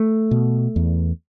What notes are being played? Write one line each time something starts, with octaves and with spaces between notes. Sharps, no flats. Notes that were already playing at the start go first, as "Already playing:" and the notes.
Already playing: A3
B2
E2